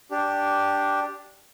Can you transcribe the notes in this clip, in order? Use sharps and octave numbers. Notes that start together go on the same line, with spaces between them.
D4 G4